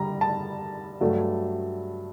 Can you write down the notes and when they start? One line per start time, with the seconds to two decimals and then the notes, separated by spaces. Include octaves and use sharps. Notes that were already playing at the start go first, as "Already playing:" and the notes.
Already playing: D3 G3 A#5
0.21 A5
1.01 G2 F#3 A3